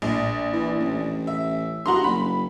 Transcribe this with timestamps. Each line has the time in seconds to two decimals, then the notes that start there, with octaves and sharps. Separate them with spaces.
0.02 A#1
0.53 E3
0.80 A1
1.27 E5
1.86 G2 F#4 A#5 C6
2.04 F#1 B5